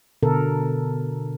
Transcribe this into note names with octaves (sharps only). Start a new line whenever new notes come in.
B2 D3 A4 A#4